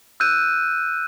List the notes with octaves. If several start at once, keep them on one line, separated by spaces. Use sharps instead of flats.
E6 F#6 G6 D#7